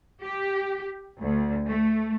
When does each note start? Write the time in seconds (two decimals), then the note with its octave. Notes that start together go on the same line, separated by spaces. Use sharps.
0.24 G4
1.20 D2
1.69 A3